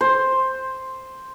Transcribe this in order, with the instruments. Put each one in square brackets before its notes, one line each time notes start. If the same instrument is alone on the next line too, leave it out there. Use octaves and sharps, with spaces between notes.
[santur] C5